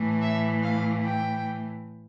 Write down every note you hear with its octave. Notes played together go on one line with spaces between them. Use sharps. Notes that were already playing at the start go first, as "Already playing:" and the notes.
Already playing: A2 E3 A3
E5
F5
G5